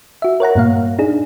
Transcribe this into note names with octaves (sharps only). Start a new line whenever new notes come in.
F#4 E5
A#4 C#5 F#5 A#5
G2 A#2 A#3 F5
D4 D#4 G#4